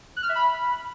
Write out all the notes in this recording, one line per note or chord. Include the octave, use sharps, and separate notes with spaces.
F#6
F6
E5
B5